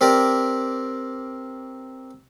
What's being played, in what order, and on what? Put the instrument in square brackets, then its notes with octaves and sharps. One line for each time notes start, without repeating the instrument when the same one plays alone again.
[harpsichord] C4 G4 A#4 D5